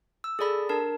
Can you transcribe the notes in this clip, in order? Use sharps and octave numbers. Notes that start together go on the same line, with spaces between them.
E6
G#4 A4 D5 B5 A#6
D4 A#4 A5